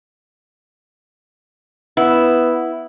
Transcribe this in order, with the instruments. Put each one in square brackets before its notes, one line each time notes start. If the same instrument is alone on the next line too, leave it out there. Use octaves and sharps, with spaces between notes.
[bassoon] B3 [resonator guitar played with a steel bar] E4